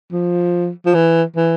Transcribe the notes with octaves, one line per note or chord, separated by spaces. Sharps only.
F3
F3
E3
E3